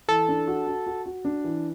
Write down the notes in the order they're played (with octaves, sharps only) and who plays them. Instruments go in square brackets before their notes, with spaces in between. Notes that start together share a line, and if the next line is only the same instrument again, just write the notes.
[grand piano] E3 [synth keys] A4
[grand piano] D4
F#4
F#4
F#4
F#4
D4
E3